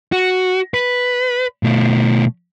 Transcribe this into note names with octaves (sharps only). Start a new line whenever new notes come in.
F#4
B4
B2 A3